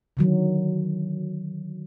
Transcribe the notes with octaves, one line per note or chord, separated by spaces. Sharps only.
D3 D#3 F#3